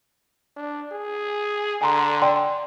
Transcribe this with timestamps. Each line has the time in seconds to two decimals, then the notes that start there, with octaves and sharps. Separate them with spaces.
0.56 D4
0.92 G#4
1.82 D3 G#5 A#5 C6
2.22 D5 G5 C6